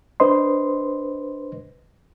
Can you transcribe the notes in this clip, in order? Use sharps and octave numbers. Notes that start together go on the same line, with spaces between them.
D4 B4 C5 D#5 C6